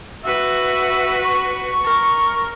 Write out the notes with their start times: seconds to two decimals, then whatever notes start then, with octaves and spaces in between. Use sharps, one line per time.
0.25 F#4 B4 E5
1.24 C#6
1.84 A#4